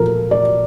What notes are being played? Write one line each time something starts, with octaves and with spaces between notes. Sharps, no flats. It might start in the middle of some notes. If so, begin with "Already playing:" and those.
Already playing: A#2 F3 A#3 A4 A#4
D5